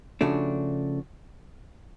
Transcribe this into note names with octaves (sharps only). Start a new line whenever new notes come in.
C#3 F3 A3 D4 F#4